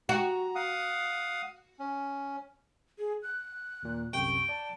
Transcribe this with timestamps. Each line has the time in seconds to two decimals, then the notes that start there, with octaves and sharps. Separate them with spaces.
0.09 F#4 A#5
0.55 F5 F#5 D#6
1.79 C#4
2.98 G#4
3.23 F#6
3.83 D#2 A#2
4.13 C2 F#2 C3 G5 C#6
4.49 D5 A5